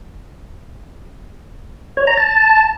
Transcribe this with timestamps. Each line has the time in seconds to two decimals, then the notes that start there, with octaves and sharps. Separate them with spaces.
1.97 C#5
2.07 A#5
2.17 A5